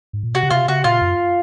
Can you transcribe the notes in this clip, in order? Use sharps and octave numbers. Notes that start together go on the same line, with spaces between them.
G#2
A#2
C3 F#4
C#3
C3 F4
C#3 F#4
A#2 F4
F#2